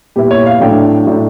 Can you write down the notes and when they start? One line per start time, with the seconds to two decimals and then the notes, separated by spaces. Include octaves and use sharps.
0.16 A#2 G3 B3 E4 G4
0.31 C#5
0.46 F5
0.60 A2 F#3 A3 D4 G5
1.06 A2 F#3 A3 D4